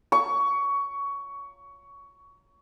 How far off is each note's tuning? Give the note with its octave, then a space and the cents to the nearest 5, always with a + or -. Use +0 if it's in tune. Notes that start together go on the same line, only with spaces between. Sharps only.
C#6 +20